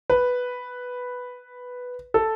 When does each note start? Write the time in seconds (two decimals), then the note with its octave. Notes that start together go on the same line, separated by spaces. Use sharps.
0.10 B4
2.14 A4